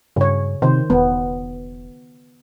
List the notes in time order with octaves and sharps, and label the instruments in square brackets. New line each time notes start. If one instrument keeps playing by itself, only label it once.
[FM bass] G2 [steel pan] C#3 C#5
[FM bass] C3 [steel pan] D#3 C5
[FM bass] E1 [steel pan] B3